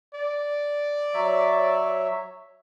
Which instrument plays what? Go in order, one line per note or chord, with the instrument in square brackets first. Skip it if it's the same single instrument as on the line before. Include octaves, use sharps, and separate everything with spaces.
[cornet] D5
[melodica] F#3 C#5 E5